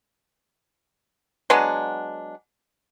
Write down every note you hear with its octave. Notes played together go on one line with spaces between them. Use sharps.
F#3 G#3 B3 D4